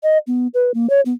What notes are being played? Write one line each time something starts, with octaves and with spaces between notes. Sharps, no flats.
D#5
B3
B4
A#3
C#5
B3